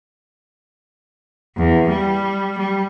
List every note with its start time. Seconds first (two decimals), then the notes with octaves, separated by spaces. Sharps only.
1.57 E2
1.89 G3
2.58 G3